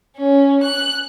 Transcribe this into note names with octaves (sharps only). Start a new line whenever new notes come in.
C#4
F#6